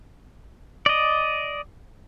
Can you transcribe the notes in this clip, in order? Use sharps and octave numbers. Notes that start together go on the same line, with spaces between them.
D5 D#5